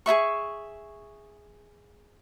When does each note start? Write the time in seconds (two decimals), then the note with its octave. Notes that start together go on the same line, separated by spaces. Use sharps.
0.06 G#4 A4 E5 C#6